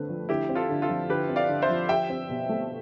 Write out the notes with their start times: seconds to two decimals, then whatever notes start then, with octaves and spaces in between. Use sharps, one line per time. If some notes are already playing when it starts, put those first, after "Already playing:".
Already playing: D3 A3 C4 B4
0.10 F3
0.29 D3 E4 G4
0.49 C4
0.55 F4 A4
0.69 D3
0.82 F4 A4
0.89 F3
1.10 D3 G4 B4
1.29 C4
1.36 D5 F5
1.49 D3
1.62 C5 E5
1.69 F3
1.89 G4 E5 G5
2.10 C4
2.29 B2
2.49 A3